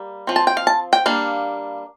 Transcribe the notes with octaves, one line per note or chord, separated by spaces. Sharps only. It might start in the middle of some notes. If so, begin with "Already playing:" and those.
Already playing: G3 A#3
F3 C4
A5
G5
F5
A5
G5
G3 A#3 D4 F5